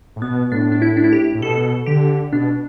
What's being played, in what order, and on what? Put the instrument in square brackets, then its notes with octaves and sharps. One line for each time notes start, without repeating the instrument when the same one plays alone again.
[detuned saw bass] A2
[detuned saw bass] B2 [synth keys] B3
[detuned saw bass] A2 [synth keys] D4
[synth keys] D4
E4
D4
E4
G4
[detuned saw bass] A2
[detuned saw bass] B2 [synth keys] A4
[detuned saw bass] D3 [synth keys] G4
[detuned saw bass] B2 [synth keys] D4